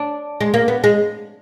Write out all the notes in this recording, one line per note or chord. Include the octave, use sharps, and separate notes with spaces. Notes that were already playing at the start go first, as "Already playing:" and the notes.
Already playing: D4
G#3
A#3
B3
G#3